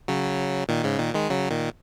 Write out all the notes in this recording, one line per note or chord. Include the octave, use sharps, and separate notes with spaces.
C#3 F#3
A#2 D#3
G#2 C#3
A#2 D#3
D#3 G#3
C#3 F#3
A#2 D#3